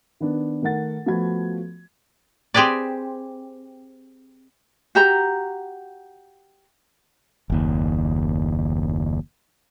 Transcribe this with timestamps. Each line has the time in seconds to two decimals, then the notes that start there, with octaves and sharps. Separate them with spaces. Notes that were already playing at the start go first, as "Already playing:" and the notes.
0.20 D#3 B3 D4
0.62 D#3 A3 A#4 F#5 A6
1.06 F3 A3 B3 F#4 B5 G#6
2.54 C4 G4 G#4 B4 D5
4.95 F#4 G4 A#5
7.50 F#1 D#2